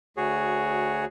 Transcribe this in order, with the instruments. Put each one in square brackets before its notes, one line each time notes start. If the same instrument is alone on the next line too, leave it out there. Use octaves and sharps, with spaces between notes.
[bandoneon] D2 F#4 G#4 C#5